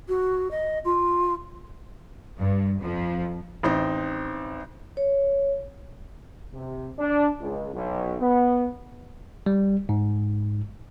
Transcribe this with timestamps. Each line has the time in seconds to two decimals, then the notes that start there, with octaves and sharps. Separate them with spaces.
0.08 F#4
0.50 D#5
0.84 F4
2.39 G2
2.80 F2 F3
3.63 A1 C4 D#4
4.97 C#5
6.54 C3
6.99 D4
7.41 C#2
7.73 B1
8.21 B3
9.46 G3
9.89 G#2